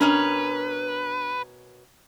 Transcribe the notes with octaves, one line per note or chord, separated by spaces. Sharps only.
B2 C#4 D4 A#4 B4